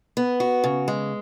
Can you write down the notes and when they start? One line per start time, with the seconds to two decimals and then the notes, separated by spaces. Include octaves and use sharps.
0.17 B3
0.40 F#4
0.64 C#3
0.88 G#3